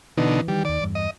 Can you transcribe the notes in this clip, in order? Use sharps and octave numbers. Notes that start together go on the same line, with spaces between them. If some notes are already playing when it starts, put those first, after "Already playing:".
B2 D3 E3 D#4
D#3 E3 G3
D#2 D#3 D5
E2 G2
D#5